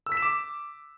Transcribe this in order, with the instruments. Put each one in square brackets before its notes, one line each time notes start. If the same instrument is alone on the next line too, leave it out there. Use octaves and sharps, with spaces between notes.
[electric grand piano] E6
B6
E7
D6